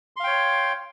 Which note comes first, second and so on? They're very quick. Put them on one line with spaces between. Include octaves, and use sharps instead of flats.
C6 F5 G5 C#5